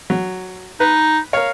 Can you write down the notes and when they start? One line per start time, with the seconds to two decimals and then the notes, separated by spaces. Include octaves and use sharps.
0.10 F#3
0.80 D#4 B4
1.33 A#4 C#5 F5